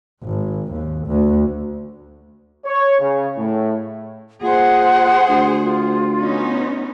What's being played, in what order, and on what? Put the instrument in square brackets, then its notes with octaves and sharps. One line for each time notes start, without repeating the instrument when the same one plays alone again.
[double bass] G#1
D#2
D2
[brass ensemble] C#5
C#3
A2
[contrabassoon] A#2 [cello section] G#4 C5 [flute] F#5
[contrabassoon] D2
[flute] F4
[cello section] B3 C#4 D#4